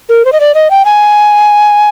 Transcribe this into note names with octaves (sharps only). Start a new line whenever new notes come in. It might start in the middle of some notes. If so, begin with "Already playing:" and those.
A#4
C5
D#5
D5
D#5
G5
G#5